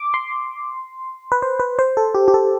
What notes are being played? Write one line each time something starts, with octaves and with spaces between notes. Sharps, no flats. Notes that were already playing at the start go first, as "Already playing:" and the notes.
Already playing: D6
C6
B4
C5
B4
C5
A4
G4
G4
A4